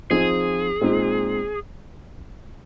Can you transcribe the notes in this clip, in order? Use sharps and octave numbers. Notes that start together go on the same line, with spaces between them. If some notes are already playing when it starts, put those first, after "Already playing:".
F3 C4 D#4 G#4
A#2 G#3 C4 D#4